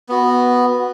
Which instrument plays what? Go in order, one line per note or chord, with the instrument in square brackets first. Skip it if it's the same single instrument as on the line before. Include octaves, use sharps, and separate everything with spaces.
[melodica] B3 F#4